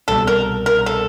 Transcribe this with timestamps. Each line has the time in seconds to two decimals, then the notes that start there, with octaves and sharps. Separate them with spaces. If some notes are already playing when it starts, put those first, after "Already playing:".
0.08 C2 B2 G3 A4
0.27 A#4
0.66 A#4
0.86 A4